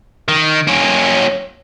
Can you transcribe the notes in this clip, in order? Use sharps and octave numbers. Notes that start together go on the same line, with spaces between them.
D#3
A#3 C#4